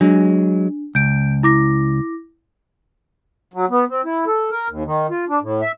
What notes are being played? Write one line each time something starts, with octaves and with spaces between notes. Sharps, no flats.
F#3 G#3 D4
C#2 G6 D7
E4 D6 A#6
F#3
B3
C4
E4
A4
A#4
D#2
D#3
F4
D4
A2
E5